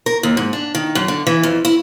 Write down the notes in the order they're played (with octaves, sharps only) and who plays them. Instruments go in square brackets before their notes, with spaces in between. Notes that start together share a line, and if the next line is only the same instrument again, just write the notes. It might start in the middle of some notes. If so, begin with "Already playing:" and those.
[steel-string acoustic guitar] A#4
D#2
G#2
D4
D#3
F#2
D3
E3
F2
E4